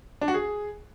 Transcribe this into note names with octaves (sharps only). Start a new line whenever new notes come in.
D4
F#4
G#4